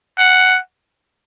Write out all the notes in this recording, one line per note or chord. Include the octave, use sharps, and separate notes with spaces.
F#5